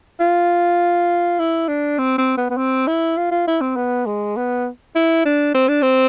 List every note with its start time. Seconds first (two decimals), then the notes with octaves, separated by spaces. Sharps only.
0.20 F4
1.40 E4
1.68 D4
1.98 C4
2.18 C4
2.38 B3
2.50 B3
2.57 C4
2.87 E4
3.17 F4
3.31 F4
3.47 E4
3.61 C4
3.76 B3
4.06 G#3
4.37 B3
4.96 E4
5.25 D4
5.55 C4
5.68 D4
5.82 C4